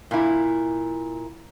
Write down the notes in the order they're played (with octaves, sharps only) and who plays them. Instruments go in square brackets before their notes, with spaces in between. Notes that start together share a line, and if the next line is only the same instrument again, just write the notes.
[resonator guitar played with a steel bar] A#2 E4